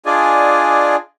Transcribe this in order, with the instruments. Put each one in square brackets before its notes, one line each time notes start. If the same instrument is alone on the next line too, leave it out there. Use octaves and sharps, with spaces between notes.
[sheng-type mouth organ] D4 F4 G#4 D5 D#5 G#5